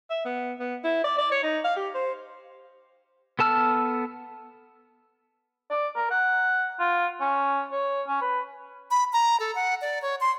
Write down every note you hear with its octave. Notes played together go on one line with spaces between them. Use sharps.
E5
B3
B3
E4
D5
D5
C#5
D#4
F5
G4
C5
B3 A4 A5 E6 F6
D5
A#4
F#5
F4
C#4
C#5
C#4
B4
B5
A#5
A4
F#5
D5
C#5
C6